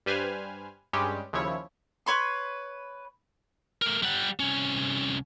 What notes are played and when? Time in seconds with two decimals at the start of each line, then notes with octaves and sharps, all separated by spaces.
0.06 G2 G3 B4 C5 G#5 F6
0.93 G2 G3 G#3 C#4 G4
1.33 D#2 C#3 F3 E4 C#5
2.06 B4 C#5 B5 C6
3.82 A3 A#4
4.03 G3 F#5
4.40 C2 C#4